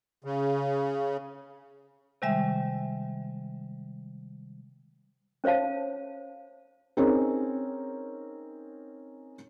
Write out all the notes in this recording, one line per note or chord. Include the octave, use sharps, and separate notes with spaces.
C#3
C3 D#3 G3 G#3 E5
C#4 C5 C#5 F5 A5
C4 C#4 D#4 G#4 A#4 C#5